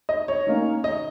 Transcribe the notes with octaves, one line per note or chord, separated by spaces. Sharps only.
D#5
C#5
D#3 A#3 C#4
D#5